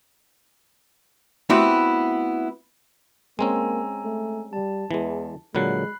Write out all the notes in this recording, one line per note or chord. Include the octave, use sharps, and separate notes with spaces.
A3 B3 C4 E4 F#4 G4
G#3 A#3 C4 C#4 G#5 A#5 E6
A3
G3 A5
E2 E3 G#3
A#2 D3 F#3 G#3 B5 F#6 C7